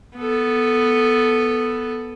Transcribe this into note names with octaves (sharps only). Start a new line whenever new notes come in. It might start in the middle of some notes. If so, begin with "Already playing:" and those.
B3 A4